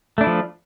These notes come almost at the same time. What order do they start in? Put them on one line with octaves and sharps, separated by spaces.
A3 D4 E4 F3